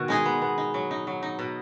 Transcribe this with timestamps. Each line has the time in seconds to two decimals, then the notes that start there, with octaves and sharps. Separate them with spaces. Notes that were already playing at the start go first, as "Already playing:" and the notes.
Already playing: B2 D#3 F#4
0.08 G#3 D#4 G#4
0.26 B3
0.42 B3
0.58 D#4
0.74 F#3
0.91 D#4
1.07 F#3
1.23 D#4
1.39 B2